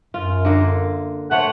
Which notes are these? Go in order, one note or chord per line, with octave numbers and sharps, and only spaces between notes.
F#2 F4
D3 A#3
A3 C5 C#5 F#5